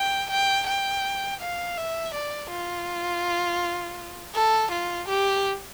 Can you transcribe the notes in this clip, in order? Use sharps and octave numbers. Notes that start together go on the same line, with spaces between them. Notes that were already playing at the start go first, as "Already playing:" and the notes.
Already playing: G5
G5
G5
F5
E5
D5
F4
A4
F4
G4